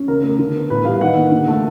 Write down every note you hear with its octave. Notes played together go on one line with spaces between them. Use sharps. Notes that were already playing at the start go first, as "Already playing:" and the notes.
Already playing: C#4
C#3 A#4
A3
D3
B3
A2 B4
G3 F5
D#3 F#5
A#3
D3
A3